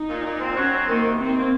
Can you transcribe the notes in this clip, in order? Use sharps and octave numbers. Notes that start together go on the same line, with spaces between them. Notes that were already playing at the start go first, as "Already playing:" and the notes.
Already playing: D#4
A#2
A#2
C4
F#3 C#4
C4
D#3 A#3
C3
D#3 C4
A#3